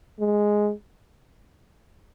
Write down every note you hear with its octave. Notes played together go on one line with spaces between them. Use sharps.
G#3